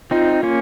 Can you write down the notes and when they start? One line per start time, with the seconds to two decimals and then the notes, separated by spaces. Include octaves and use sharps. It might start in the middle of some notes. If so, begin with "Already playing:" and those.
0.11 C4 D#4 F4
0.43 A#3 C#4